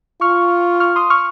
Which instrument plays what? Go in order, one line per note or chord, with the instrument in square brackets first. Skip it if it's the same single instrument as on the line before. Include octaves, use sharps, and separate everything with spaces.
[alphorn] F4 [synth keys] C#6 F6
[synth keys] C#6 F6
C6 D#6
C#6 F6